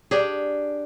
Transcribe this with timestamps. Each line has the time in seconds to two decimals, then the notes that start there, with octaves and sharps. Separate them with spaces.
0.11 D4 G4 G#4